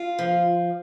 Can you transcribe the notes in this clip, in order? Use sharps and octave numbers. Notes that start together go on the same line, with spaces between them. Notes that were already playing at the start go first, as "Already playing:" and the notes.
Already playing: F4
F3